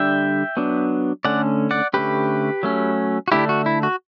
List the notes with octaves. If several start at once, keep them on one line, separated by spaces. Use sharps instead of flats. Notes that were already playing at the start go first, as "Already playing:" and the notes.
Already playing: D3 G3 D4 E5 G5
F#3 B3 D4
D3 A3 C#4 D5 F#5
D5 F#5
D3 A3 C#4 G4 B4
F#3 A3 C#4
F#4
D3 A3 D4 E4 G4
F#4
E4
F#4